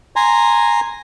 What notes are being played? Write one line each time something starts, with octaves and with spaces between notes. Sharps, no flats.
G#5 A#5 C6